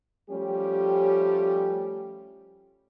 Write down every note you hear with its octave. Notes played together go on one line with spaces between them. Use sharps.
F3 G3 A3 C#4 G4